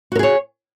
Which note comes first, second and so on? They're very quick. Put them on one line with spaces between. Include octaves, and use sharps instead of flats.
F#4 A#4 G#4 C#5